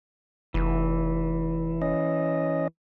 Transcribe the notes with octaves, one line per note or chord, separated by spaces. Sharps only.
F1 E3
C#4 D#5